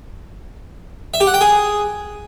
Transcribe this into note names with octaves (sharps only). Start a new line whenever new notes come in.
E5
G4
F#5
G5
G#4